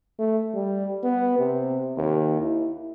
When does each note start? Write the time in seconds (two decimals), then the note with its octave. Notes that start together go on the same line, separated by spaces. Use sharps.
0.19 A3
0.54 G3
1.04 B3
1.39 C3
1.97 D#2
2.41 E4